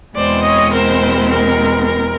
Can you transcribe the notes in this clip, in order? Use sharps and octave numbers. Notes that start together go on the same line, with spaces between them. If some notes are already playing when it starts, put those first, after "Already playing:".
E2 B2 G#3 C4 C5 D5
C#5 D#5
A#4 C5
A#4
A#4